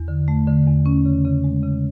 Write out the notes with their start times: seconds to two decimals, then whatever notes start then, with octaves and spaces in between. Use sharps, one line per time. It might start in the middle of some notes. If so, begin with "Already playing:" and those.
Already playing: E2
0.08 D3
0.28 A3
0.47 D3
0.67 E2
0.86 C#4
1.05 C#3
1.25 C#3
1.44 G#3
1.63 C#3